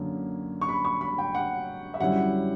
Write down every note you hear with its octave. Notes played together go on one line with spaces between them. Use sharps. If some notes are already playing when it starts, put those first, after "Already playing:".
Already playing: F#2 D3 A#3 C#4
C#6
B5
C#6
B5
G5
F#5
E5
F#2 D3 G3 C#4 E4 F#5